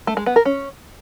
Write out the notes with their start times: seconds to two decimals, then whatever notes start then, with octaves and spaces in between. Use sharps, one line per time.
0.07 A3
0.17 G#3
0.26 B3
0.36 A#4
0.45 C#4